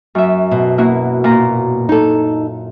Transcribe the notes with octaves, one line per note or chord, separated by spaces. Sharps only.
F#2 E5
B2
A#3 E4 F#4
A#2 A#5
D#4 A4